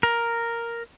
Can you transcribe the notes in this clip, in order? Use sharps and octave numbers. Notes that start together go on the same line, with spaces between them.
A#4